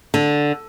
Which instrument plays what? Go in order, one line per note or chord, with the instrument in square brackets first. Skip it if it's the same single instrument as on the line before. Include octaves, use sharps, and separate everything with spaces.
[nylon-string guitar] D3